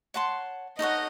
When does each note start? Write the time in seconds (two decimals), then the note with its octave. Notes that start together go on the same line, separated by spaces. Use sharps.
0.14 C#5 F#5 A5 C6
0.79 D#4 A4 C#5 D#5 F#5